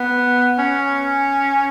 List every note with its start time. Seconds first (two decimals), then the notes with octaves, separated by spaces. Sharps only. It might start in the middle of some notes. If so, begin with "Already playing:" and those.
Already playing: B3
0.58 C#4